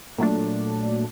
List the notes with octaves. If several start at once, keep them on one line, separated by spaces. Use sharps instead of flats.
A#2 F#3 A3 D4